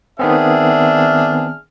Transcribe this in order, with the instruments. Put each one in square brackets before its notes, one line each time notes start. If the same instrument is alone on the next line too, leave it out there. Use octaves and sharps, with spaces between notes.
[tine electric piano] D#3 B3 C4 [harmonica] D4 G#4 F6 [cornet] E5